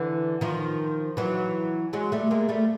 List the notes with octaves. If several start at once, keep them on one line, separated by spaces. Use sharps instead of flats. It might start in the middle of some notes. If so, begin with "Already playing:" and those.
Already playing: D3 E3
D#3 F3
E3 F#3
F#3 G#3
G3 A3
G#3 A#3
G3 A3